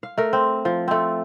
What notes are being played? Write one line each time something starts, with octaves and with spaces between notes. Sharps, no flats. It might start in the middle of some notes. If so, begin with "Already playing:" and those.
F5
A3 A#4
C4
F3
A3 C4